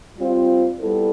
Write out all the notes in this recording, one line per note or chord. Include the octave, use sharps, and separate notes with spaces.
G3 C4 F4 C5
G3 B3 E4 A4